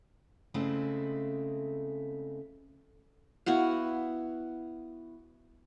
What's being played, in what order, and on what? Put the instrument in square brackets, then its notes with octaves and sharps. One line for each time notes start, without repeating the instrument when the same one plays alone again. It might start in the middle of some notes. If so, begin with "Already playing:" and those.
[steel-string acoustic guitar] C#3 G#3 A3 C4 E4
[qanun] B3 E4 F#4 F5